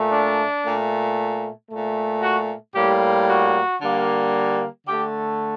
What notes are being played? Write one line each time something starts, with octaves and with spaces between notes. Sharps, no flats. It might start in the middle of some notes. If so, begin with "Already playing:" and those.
Already playing: A#2 A3
D4
A#2 A3
A#2 A3
F#4
A2 G3 A#3 G4
F#4
D3 G3 A#3
D3 A3 G4